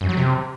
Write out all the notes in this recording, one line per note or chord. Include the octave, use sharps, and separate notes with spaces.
F#2
F#3
C3